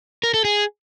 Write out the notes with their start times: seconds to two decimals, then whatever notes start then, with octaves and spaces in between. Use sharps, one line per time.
0.23 A#4
0.34 A4
0.45 G#4